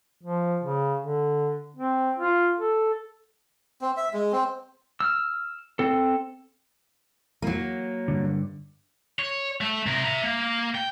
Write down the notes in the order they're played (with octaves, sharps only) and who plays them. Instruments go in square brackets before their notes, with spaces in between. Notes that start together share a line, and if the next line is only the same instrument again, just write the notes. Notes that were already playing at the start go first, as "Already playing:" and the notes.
[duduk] F3
C#3
D3
C4
F4
A4
[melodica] C4
E5
G#3
C4
[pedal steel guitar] E6 F6
C4 A4
[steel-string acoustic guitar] F#3 A#3
[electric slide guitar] G2 D3
[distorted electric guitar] C#5
A3
C3 A#4
E5 A#5
A#3
G5